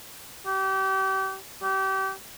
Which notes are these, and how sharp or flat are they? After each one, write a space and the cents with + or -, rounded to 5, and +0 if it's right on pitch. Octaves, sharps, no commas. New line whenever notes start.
G4 -35
G4 -30